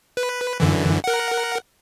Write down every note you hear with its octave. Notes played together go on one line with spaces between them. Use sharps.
B4
F#2 D3 E3
A#4 F#5